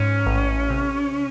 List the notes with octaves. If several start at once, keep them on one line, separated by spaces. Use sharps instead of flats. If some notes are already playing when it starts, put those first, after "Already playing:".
Already playing: G#2 C#4
A1
C3